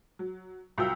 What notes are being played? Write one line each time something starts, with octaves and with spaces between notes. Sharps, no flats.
F#3
C2 F#3 F4 G5 E6